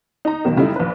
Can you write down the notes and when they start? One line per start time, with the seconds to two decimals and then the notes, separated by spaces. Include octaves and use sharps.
0.25 D#4 A#5
0.45 B1 B2 D#3
0.56 F#2 C#3 G3 A3 D#4 E4
0.76 A#1 B4